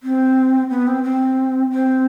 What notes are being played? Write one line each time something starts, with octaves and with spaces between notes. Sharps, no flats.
C4
B3
C4
C4
C4